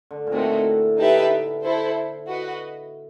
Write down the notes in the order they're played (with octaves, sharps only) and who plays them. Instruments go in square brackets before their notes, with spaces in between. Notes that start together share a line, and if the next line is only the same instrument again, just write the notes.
[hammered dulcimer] D3
A#2
[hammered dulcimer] A2 [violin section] A3 C4 D#4 F#4
[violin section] D#4 G4 B4 E5 A5
E4 A4 C5
F#4 B4 D#5